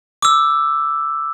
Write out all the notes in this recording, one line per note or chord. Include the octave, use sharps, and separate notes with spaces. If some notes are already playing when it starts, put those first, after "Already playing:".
D6 E6